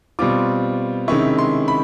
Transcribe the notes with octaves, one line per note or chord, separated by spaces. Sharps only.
B2 G3 C4 F4 D6
C3 D#3 G#3 C#4 E4 C#6
C6
B5